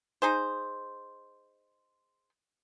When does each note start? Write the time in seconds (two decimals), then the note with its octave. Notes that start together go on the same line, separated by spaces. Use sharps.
0.22 D#4 G#4 C5